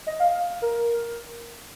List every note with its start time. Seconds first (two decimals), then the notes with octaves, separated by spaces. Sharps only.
0.07 D#5
0.20 F5
0.34 F5
0.62 A#4